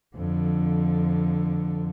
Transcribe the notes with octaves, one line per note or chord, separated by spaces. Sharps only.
F2 D3